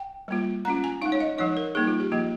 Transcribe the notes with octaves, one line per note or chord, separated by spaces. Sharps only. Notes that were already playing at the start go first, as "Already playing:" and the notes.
Already playing: G5
G3 A#3 F4
G#3 C#4 F4 A#5
G#5
G#3 D#4 F5
C#5
D#5
F3 G#3 D#4 C#5
A#4
G3 A#3 D#4 G#4
F4
G4
F3 A#3 F4